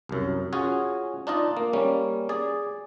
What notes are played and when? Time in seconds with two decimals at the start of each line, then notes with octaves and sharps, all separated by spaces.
0.09 C2 F#2
0.53 C#4 F4 F#4 G#4 C#5
1.27 D4 D#4 F4 D5 D#5
1.57 A#3
1.73 G3 A#3 C#4
2.29 G#4 D5